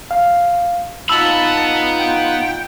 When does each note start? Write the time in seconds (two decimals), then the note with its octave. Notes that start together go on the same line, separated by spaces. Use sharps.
0.11 F5
1.09 B3 D#4 F4 A5 B5 E6
1.99 G5